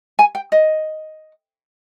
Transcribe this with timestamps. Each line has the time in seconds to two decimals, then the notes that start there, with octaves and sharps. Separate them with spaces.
0.19 G#5
0.35 G5
0.52 D#5